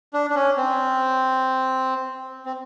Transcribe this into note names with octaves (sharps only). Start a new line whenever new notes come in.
D4
D4
C#4
C4
C4